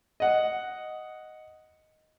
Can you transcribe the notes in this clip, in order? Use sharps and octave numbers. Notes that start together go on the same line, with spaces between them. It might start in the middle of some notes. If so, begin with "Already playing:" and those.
D#5 F#5